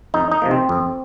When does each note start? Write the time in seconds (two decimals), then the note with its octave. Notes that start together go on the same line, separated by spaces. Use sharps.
0.14 F2 D#4
0.32 D#4
0.42 C3 F3 A#3
0.51 C4
0.69 F2